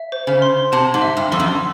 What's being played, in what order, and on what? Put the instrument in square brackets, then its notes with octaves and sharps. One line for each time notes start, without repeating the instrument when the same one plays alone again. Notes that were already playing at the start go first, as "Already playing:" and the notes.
Already playing: [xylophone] E5
C5
[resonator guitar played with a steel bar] C#3
[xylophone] C6
[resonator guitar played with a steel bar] C3 [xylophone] A5
[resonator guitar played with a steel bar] G#2
[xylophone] E5
[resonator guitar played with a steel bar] G2
[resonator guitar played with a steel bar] F2 [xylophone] C6
[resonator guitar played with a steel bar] F#2